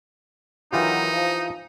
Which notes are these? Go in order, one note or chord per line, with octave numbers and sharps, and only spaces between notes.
B2 D#3 E3 F#3 D#4 F4 G4
F3